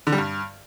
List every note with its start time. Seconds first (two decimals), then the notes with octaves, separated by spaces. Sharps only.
0.07 D3
0.12 G3
0.18 G2